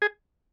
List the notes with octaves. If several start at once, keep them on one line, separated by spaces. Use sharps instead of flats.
G#4